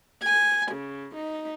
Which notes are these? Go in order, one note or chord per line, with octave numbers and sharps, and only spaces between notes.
G#5
C#3
D#4